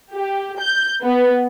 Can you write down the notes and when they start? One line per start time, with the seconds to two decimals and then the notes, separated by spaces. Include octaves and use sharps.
0.14 G4
0.59 G6
1.02 B3